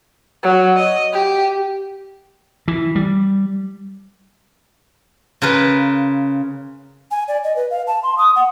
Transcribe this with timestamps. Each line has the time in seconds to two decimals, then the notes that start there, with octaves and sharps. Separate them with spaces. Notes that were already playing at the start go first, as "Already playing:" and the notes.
0.43 F#3
0.76 D#5
1.12 G4
2.68 E3
2.95 G3
5.42 C#3 F4 A#4 B4
7.11 G#5
7.28 D5
7.44 D#5
7.56 B4
7.70 F5
7.87 A5
8.03 C6
8.18 D#6
8.36 F#5